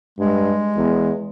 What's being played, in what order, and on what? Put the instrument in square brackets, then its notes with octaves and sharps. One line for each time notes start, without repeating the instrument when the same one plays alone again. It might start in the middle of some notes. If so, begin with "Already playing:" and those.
[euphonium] G2 [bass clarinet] G#3
[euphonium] E2